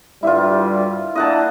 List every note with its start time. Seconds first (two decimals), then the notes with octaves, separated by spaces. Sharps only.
0.23 D2 G2 G3 E4 F4
1.15 A#3 D4 E4 D#5 F#5 A5